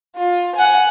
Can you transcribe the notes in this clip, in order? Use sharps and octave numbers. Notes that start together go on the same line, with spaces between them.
F4
F#5 G#5